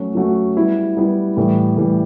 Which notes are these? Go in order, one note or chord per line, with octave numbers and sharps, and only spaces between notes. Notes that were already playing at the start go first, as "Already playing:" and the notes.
Already playing: F#3 A3 C#4 F#4
F#3 A3 C#4 F#4
G3 B3 E4
G3 B3 E4
A2 E3 G3
A2 E3 G3